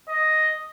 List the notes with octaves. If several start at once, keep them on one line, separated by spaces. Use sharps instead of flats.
D#5